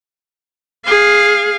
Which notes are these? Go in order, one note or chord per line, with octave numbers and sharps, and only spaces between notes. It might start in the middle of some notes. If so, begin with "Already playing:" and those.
G#4 F5